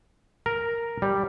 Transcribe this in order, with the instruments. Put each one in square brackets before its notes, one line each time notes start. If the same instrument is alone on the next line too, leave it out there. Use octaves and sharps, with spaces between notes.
[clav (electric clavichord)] A#4
G3